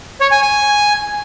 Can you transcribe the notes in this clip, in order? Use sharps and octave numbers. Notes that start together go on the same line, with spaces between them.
C#5
G#5
G#5